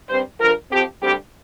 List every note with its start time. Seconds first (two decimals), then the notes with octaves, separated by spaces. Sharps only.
0.09 G2 G3 C4 C5
0.41 G2 D3 F3 A#4
0.71 F2 F3 C4 G4
1.02 D2 D3 G3 C4 G4